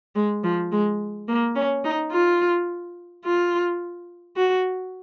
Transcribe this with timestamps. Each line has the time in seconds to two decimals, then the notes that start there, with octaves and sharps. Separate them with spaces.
0.15 G#3
0.44 F3
0.72 G#3
1.28 A#3
1.56 C#4
1.85 D#4
2.12 F4
3.25 F4
4.37 F#4